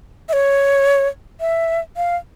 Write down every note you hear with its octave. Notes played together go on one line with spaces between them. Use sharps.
E5
C#5
E5
F5